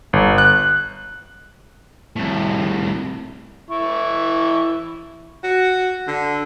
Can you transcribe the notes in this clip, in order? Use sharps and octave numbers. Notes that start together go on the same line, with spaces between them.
G1
F#6
C2 A2
E3 E4 C#6
F#4
D3